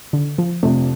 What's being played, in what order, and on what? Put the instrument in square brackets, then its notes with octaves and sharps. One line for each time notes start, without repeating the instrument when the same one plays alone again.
[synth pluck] D3
F3
[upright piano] F2 C3 F3 D4 [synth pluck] A3